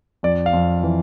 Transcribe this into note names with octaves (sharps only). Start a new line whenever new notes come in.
F2 D5
F5
F2
E3